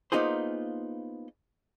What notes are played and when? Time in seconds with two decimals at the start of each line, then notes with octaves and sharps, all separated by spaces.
0.12 A#3 B3 D#4 F4 G#4 C5